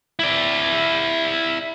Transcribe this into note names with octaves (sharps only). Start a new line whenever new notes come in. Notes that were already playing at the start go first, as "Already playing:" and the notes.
E4 D5